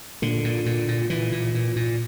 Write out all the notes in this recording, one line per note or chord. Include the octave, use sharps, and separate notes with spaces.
A#2 D3
A#2
A#2
A#2
A#2 E3
A#2
A#2
A#2